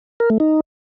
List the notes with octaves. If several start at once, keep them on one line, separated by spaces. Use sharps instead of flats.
A#4
A3
D#4